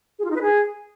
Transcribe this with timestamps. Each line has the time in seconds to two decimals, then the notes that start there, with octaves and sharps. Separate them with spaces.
0.19 G#4
0.25 F4
0.30 D#4
0.36 B4
0.42 G#4